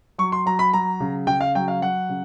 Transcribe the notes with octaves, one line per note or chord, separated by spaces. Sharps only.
F#3 C#6
C6
F#3 A#5
B5
F#3 A#5
C#3
C#3 G5
F5
F#3 G5
F5
F#3 F#5
C#3